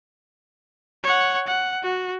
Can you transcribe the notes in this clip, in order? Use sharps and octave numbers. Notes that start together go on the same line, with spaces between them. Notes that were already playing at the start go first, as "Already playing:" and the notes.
C#5 F#5
F#5
F#4